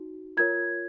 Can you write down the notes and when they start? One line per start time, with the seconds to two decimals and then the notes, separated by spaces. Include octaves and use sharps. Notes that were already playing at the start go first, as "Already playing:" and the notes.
Already playing: D#4 F#4
0.37 F4 A#4 C#5 G#6